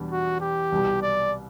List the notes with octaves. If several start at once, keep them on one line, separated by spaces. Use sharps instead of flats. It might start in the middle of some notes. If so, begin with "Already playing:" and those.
Already playing: E2 B2 G3 D4
F#4
G4
C2 B2 G3
D5